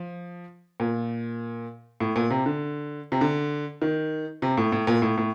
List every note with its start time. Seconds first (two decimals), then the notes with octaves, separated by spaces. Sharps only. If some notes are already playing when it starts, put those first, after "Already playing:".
Already playing: F3
0.80 A#2
2.00 A2
2.16 A#2
2.31 C3
2.46 D3
3.12 C3
3.21 D3
3.82 D#3
4.42 C3
4.57 A2
4.72 A2
4.87 A#2
5.02 A2
5.18 A2